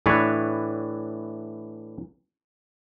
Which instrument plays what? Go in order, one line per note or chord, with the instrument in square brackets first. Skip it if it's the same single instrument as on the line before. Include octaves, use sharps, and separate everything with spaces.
[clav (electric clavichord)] A2 E3 D4 B4 C#5